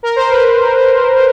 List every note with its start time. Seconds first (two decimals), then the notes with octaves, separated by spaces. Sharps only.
0.03 A#4
0.16 C5
0.30 B4